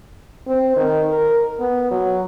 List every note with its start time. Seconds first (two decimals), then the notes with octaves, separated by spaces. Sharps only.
0.47 C4
0.77 D#3
1.09 A#4
1.60 B3
1.91 F#3